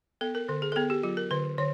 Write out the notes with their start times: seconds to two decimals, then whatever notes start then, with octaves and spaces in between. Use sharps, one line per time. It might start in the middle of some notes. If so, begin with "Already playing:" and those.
0.21 B3 A4
0.35 A#4
0.48 D3 A4
0.62 G#4
0.72 A4
0.76 B3 G#4
0.90 G4
1.03 F#3 F4
1.17 A#4
1.31 D3 B4
1.58 D3 C#5